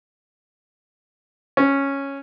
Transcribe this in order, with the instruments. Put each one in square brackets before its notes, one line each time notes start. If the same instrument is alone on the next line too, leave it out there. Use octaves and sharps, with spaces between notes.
[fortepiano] C#4